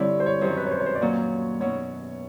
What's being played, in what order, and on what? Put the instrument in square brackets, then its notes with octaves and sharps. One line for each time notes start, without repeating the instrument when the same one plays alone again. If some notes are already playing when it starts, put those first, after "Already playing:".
Already playing: [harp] G2 D3 G3 C4 E4 [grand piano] C#5
[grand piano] C5
C#5
[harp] F#2 D#3 F#3 [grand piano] C5
[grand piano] B4
C#5
C5
C#5
C5
D5
[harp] A#2 F#3 A#3 [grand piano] C#5
[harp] B2 F#3 B3 D#4 [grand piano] C#5